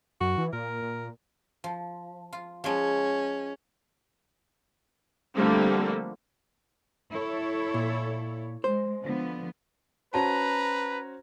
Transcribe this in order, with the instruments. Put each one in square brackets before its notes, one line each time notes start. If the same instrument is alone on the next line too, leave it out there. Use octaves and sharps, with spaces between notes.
[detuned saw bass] F#2 [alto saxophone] F#4
[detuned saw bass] E3
[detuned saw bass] A#2 [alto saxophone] A#4
[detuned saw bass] A#2
[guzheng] F3
F4
[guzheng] F3 G#3 [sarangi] C#4
[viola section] D3 F3 G3 A3 A#3 C4
[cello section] E4 A4 C#5
[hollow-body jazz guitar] A#2
[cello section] G#3 [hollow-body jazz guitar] C5
[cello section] D3 F3 B3
[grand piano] C#4 F#4 C5 [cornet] B4 [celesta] A5 [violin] A#5